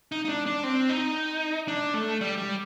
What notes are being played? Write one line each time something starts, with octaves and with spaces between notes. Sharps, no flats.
D#4
D#4
D4
D4
C4
D#4
D4
A3
G3
G3